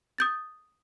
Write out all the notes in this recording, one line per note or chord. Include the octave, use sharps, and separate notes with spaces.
D#6 G6 A6